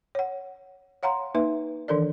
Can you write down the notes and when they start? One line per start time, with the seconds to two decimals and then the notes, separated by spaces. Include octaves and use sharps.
0.15 C#5 F#5
1.03 C#5 F5 F#5 A#5 C6
1.35 A#3 D#4 B4 E5
1.88 D#3 E3 D4 A4 A#4 D5